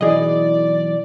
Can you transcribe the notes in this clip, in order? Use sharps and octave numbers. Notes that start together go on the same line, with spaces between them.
B1 E3 G#4 D5 D#5